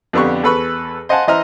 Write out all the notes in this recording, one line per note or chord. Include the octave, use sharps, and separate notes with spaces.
F2 D3 B3 G4 C#6
E2 A4 B4 B5 C#6
C5 D#5 F5 F#5 G#5 A5
E3 C5 D#5 E5 A#5 F6